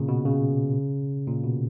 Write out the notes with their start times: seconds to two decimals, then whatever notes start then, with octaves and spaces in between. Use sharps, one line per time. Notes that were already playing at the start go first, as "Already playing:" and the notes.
Already playing: A#2 C#3
0.08 B2
0.25 C#3
1.28 A#2
1.44 B2